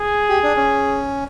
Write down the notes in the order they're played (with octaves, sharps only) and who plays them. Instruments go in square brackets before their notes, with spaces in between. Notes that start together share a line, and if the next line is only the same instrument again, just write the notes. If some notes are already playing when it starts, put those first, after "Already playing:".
Already playing: [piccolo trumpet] G#4
[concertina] G4
D4
C#4